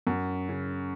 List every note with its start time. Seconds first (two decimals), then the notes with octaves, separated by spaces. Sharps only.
0.07 F#2
0.49 C#3